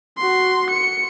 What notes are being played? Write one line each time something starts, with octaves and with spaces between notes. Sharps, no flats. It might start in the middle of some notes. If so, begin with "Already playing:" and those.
F#4 C6
C#7